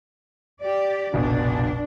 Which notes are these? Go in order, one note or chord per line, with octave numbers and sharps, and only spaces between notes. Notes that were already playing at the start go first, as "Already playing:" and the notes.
G4 D5
F1 A#1 B2 D4